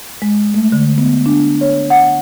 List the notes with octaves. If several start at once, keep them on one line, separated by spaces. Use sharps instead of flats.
G#3
A3
D3
B3
D4
C#5
F#5